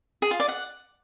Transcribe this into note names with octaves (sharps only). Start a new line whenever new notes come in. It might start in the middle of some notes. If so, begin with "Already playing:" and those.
G#4
F4
D5
F#5